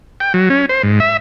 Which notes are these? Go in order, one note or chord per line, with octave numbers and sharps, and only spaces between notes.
G5
F#3
C#4
C5
G#2
E5